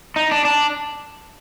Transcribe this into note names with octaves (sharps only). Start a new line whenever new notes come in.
D#4
D4
D4